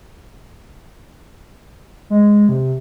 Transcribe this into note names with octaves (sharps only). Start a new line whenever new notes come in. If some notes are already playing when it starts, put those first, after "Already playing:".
G#3
C3